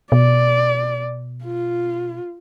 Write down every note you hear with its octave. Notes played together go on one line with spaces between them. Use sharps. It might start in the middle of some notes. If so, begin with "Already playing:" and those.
B2 D5
F4